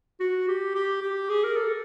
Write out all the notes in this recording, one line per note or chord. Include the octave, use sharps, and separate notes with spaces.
F#4
G4
G4
G4
G#4
A#4
A4